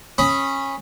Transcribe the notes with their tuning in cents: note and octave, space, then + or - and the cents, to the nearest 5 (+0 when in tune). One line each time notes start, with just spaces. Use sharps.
C#4 -20 B5 +0 D#6 +5